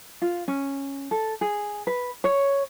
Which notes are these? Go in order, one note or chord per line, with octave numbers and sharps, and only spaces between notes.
F4
C#4
A4
G#4
B4
C#5